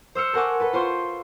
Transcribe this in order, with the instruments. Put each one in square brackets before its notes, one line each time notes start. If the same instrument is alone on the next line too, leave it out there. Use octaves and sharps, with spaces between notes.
[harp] C5 E6 F6 C#7
A4 A#4 F#5 G#5 C#6 D6
A4 B4
F4 C5 C6 C#6